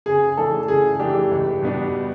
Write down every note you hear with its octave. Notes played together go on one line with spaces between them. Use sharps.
C#3 G#4
E3 A3 D4 A4
C#3 G#4
E3 A3 D4 G4
C#2
B2 G3 B3 D4